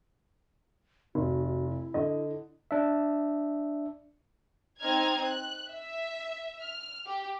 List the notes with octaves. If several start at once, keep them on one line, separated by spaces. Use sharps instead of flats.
F1 D#4 F#4
F#4
E4
D3 D#5
D4 E5
C4 D#4 A#5 F6 G#6
F#6
E5
F6
G4